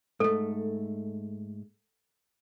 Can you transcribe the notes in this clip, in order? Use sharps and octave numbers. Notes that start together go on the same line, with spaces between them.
G#2 A3 A4